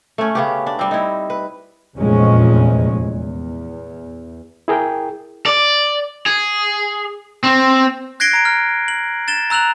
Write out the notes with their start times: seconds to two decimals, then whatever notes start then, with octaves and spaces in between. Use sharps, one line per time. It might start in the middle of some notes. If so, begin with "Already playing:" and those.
0.18 A3 C#4
0.35 C#3 B3 G4
0.66 D4
0.79 G3 C4
0.91 D#4 E4
1.30 B4
1.97 F1 E2 A#2 F3 G#3 C#4
2.95 E2
4.68 E4 G#4 A#4 G5
5.46 D5
6.26 G#4
7.44 C4
8.20 F#6 G#6 A#6 C7 D7 G7
8.33 A#5 D7
8.45 F6
8.88 F#7
9.28 A6 E7 G7
9.50 A#5 E6 F#6 F7 F#7